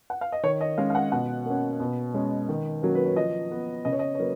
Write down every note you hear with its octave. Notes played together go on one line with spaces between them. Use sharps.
F#5
F5
D#5
D#3 C#5
D#5
G#3 C#4 F5
F5
F#5
B2 F#5
A#3 C#4
B2
G#3 C#4
D#3
F#3 A#3 C#4
B4
C#5
F3 D#5
B3
C#3 D#5
C#5
D#5
C#5
F#3 A#3 B4